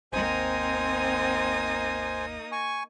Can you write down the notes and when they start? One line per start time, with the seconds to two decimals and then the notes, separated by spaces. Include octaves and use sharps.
0.13 G#1 D#2 A#3 C4 D#4 C5 G#5 D#6
2.52 G#5 C#6